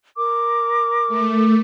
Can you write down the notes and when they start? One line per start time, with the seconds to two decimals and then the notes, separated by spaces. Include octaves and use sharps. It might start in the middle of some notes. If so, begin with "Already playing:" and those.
0.16 A#4 D6
1.08 A3